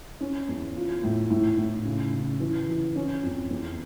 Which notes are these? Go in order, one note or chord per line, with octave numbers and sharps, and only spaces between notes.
C#4
E2
F4
A2
A2
A2
C#3
C#3
E3
E3
C#4
F2
E2